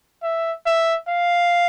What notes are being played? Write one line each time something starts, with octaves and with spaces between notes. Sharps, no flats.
E5
E5
F5